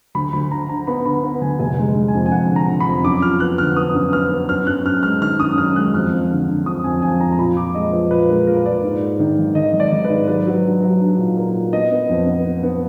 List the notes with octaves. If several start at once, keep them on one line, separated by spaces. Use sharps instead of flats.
D2 B5
D2 B5
D3 A#5
D3 A#5
B3 B5
D3 B5
B3
D2 G#5
F1 G#5
G#3
G#3
G#5
F2
G#5
F2 F#5
D3
A#5
D3
B5
F2
F#2 D6
F3 F6
B3 F#6
D3 F6
B3 D#6
F#2
B3 F6
B3
F#2 F6
F#2 F#6
F#2 F6
G#3 F6
D#3 F6
F#2 D#6
F#2 F6
G#3 F#6
F2 F6
F2
D3
D3
F2 D#6
F2 G#5
F2 G#5
F2 A#5
A#5
A#2 B5
A#2 D6
G#3 D#5
F3 B4
A#2 B4
G#3 A#4
A#2 A#4
B4
A#2 D5
G#2
G#2
D#3
G#1
D#3 D#5
G#1
D5
G#1
B4
G#2
F#3 B4
F#3
D4
F#3
D4
A#2
A#3
A#2
B3 D#5
B3
F2
B3
B3
B3